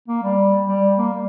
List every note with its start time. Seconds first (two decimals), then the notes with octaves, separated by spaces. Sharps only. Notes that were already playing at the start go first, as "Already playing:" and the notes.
0.08 A#3
0.23 G3
0.68 G3
0.98 A#3
1.13 G3